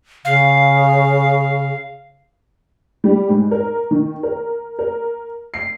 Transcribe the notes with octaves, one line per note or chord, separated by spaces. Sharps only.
C#3 F5
G3
G#2
A#4
D#3
A#4
A#4
C7